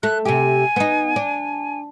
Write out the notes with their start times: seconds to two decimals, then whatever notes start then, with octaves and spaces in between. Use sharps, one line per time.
0.03 A3 F#6
0.25 C3 G4 G#5
0.76 B3 D#4
1.16 D4